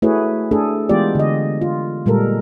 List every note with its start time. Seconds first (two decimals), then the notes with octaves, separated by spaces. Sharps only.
0.02 A3 E4 F#4 G#4 B4 C#5
0.51 A3 D4 G#4 A4
0.89 E3 G#3 B3 F4 G4 D5
1.15 D3 D#5
1.62 F4
2.06 A#2 G3 G#3 A4 A#4